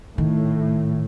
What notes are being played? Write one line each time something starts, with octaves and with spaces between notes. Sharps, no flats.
A2 D#3